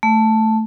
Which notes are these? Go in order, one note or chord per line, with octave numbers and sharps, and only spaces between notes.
A3